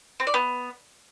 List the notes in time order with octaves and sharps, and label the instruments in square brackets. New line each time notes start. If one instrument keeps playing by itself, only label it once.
[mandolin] C4
D5
B3